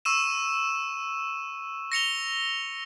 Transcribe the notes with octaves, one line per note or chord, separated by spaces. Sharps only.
C#6 E6 D#7 E7
A#6 C#7 F7 G7